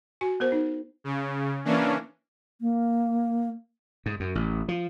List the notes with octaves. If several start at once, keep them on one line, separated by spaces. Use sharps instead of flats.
F#4 G#5
B3 A#4 C5
D#4
C#3
E3 A#3 C#4 D4
A#3
G#2
F#2
A1
F3